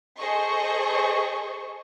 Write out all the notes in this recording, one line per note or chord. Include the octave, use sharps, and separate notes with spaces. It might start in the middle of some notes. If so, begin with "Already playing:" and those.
G#4 A4 C5 D#5 C#6